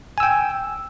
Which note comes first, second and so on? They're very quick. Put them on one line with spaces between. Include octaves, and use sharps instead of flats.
G#5 E6 G5